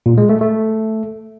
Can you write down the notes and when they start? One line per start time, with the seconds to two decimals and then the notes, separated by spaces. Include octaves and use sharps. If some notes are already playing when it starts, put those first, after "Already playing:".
0.06 A#2
0.18 G#3
0.29 A3
0.41 A3